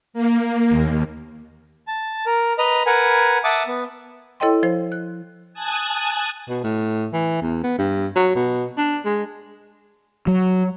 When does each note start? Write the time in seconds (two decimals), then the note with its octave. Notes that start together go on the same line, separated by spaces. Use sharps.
0.14 A#3
0.70 D#2
1.87 A5
2.26 A#4
2.58 B4 D#5 A#5
2.86 A#4 B4 F#5 G#5
3.44 E5 F#5 A5 D6 D#6
3.67 B3
4.40 E4 A4 C#5 D#5 G5 C6
4.63 F3 C5
4.92 F#6
5.53 G#5 A5 D#6 F#6 G#6
6.49 B2
6.64 A2
7.13 E3
7.42 E2
7.63 B3
7.79 G2
8.16 F#3
8.36 B2
8.78 D4
9.05 G#3
10.27 F#3